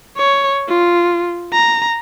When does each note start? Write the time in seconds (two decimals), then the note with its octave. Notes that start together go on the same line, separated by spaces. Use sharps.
0.17 C#5
0.69 F4
1.53 A#5